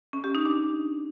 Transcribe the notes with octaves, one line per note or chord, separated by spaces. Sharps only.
C#4
G4
D#4
D4